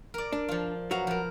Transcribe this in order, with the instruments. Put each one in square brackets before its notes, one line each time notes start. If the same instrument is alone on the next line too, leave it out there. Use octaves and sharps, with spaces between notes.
[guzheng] A#4 D5
[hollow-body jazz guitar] D4
[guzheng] F3 F4
[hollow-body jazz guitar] F#3 F#4 [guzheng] B4 F5 A#5
[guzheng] F3 A#4